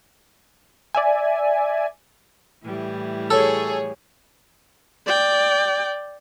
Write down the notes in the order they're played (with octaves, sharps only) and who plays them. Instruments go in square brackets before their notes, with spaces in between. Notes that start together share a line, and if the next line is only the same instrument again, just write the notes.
[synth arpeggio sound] D5 E5 G#5
[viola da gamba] A2 E3 G3
[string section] G#4 C#5 [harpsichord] A4
[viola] D5 G5